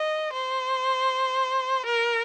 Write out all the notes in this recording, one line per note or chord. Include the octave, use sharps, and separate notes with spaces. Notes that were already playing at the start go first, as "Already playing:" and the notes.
Already playing: D#5
C5
A#4